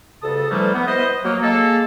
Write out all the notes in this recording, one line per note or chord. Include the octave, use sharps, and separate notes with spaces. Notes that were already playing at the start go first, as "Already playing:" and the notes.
D2 G2 C#3 A4 A5 D#6
D3 E3 F3 G3 A3 A#3
B3
E4 B4 C5 D#5
F#3 A#3
G#3 A#3 A4